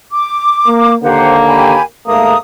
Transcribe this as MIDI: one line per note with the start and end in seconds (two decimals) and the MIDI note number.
0.12 0.95 86
0.66 0.94 58
1.02 1.77 39
1.02 1.77 50
1.02 1.77 58
1.02 1.36 67
1.02 1.36 72
1.02 1.36 78
1.46 1.82 67
1.46 1.82 80
1.46 1.82 83
2.06 2.33 44
2.06 2.33 57
2.06 2.33 58
2.06 2.38 82
2.06 2.38 87